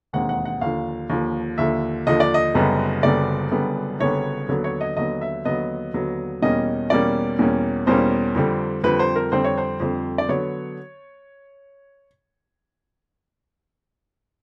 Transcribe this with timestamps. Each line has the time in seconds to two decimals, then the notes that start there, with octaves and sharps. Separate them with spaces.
0.13 E1 D#2 D#3 G#3 C4 F#5
0.29 F#5
0.45 F#5
0.61 D#2 D3 F3 F5
1.09 D#2 D3 F3
1.58 D#2 D3 F3 E5
2.06 D#2 D3 F3 D#5
2.20 D5
2.34 D#5
2.55 F#1 F#2 D3 G3 B3
3.03 F#1 F#2 D3 G3 B3 D5
3.52 F#1 F#2 D3 G3 B3
4.00 F#1 F#2 D3 G3 B3 C#5
4.48 D#2 D3 F#3 B3
4.64 C#5
4.81 D#5
4.97 D#2 D3 F#3 B3 D#5
5.21 E5
5.45 D#2 D3 F#3 B3 D#5
5.94 D#2 D3 F#3 B3
6.42 E2 B2 G3 A#3 C#4 D#5
6.90 E2 B2 G3 A#3 C#4 D5
7.39 E2 B2 G3 A#3 C#4
7.87 E2 B2 G3 A#3 C#4 C5
8.35 F2 D3 G3 C4
8.84 F2 D3 G3 C4 B4
8.99 C5
9.16 A#4
9.32 F2 D3 G3 C4 C5
9.44 C#5
9.58 C5
9.80 F2 D3 G3 C4
10.18 D5
10.29 D3 F#3 B3 C#5